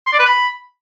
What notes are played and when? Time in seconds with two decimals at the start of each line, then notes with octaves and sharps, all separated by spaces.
0.07 C6
0.13 D5
0.19 B4
0.26 B5